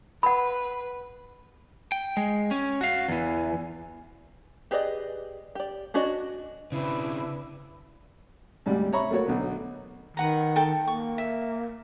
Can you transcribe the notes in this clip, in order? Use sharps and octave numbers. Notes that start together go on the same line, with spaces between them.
B4 F#5 B5
G5
G#3
C#4
F#4 F5
E2 E3
G4 G#4 B4 D5 D#5
G4 D5
C#4 D4 F#4 D5 D#5
C#3 C4 D4 E4 B4
D2 G#2 C3 G3
C#5 E5 A#5 B5 C#6
A3 A#3 F#4 C#5
B1 D3 B3
D#3 B4 F#5 A#5
A4 G5 A5
A#3 C#6
E5